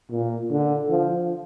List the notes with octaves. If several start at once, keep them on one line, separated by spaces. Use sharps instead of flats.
A#2
D3
F3